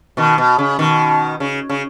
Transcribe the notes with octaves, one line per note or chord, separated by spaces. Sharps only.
B2 D#3
B2
C#3
B2 D#3
C#3
C#3